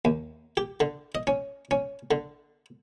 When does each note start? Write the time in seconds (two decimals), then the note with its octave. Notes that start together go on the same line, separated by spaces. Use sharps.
0.05 D#2
0.57 G4
0.80 D3
1.15 D#5
1.27 C#4
1.71 C#4
2.11 D3